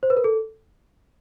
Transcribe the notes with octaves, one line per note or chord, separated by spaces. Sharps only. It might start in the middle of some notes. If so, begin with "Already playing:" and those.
C5
B4
A#4
A4